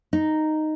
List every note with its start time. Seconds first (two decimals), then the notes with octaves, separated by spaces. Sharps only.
0.13 D#4